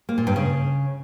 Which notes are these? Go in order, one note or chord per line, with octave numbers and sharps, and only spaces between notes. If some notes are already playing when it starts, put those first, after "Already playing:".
A#3
A#2
G2
C#3